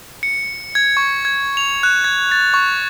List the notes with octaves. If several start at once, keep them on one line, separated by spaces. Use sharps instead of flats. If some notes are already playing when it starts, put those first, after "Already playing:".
C#7
G#6
C#6
G#6
F7
F#6
G#6
A6
C#6